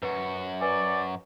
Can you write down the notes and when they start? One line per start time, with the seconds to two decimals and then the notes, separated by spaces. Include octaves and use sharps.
0.02 F#2 F#4 B4
0.61 B4 D5 G#5